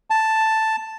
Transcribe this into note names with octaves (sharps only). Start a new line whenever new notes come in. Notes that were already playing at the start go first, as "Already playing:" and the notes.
A5